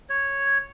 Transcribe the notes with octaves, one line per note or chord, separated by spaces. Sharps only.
C#5